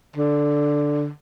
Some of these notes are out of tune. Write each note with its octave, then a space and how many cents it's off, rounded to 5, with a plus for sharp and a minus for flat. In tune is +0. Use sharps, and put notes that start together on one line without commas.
D3 +0